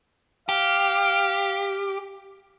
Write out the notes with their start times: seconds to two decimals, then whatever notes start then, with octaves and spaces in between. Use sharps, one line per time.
0.49 G4 F5